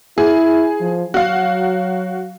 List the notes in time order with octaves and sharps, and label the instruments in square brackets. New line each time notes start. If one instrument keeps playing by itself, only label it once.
[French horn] E4 [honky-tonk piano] G#4
[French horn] F3
[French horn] F#3 [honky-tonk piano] F#4 F5